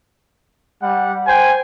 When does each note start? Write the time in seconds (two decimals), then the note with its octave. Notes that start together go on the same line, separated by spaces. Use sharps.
0.81 G3 F#5
1.26 C5 G5 G#5